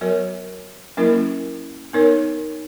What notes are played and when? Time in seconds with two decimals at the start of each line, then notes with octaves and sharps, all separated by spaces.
0.01 F#3 B3 F#4 A#4 C#5
0.97 F#3 A#3 C#4 E4 A#4
1.93 B3 D#4 A#4 C#5